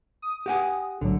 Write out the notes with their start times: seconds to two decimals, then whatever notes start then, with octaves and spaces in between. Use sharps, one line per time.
0.22 D#6
0.46 G4 F#5 G#5
1.01 B1 A2 D3 F#3